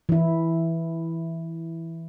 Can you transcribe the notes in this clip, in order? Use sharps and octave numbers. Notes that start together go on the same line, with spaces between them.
E3 E4